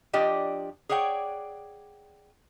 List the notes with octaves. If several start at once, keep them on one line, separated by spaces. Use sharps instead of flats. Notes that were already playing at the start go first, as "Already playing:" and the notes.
F3 D4 G4 D5 D#5
G#4 C#5 D5 F#5 G5